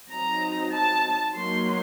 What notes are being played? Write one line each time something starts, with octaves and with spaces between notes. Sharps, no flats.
F#3 C4 D#4 A#5
A5
F#3 A#3 D#4 C6